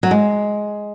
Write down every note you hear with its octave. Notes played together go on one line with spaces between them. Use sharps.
F#3
G#3